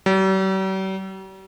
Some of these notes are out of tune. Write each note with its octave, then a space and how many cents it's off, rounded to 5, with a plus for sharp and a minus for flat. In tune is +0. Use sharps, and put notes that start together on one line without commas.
G3 -45